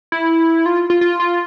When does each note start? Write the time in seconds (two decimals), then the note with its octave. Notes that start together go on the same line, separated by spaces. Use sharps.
0.12 E4
0.66 F4
0.90 F4
1.01 F4
1.20 F4